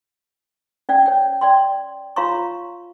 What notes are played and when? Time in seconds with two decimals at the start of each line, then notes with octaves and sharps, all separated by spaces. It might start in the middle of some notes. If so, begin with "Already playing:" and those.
0.89 C#4 D5 F#5 G5
1.06 C#5 G5
1.41 D5 G5 C6
2.16 F4 C#5 F5 A#5 C6 C#6